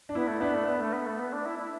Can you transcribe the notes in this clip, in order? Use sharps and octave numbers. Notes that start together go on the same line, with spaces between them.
D4
B3 E4
A3
B3 D4
A3
B3
A3
B3
A3
B3
D4
E4
E4